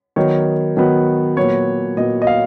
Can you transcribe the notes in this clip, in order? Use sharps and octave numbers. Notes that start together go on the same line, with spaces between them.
D#3 F#3 B3 C#5
D#3 F#3 B3
A#2 F#3 B3 C#5
A#2 F#3 B3 D#5
D#5
F5